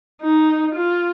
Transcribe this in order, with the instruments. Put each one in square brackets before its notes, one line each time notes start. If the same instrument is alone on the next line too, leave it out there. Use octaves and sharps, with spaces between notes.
[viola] D#4
F4